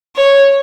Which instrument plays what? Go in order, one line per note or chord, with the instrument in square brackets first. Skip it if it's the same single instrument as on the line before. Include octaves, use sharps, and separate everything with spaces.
[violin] C#5